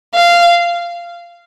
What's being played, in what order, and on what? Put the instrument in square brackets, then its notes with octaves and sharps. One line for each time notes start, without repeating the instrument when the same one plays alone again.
[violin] F5